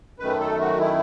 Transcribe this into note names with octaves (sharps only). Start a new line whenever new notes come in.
F#2 D#3 A3 B4
A4
F#4
E4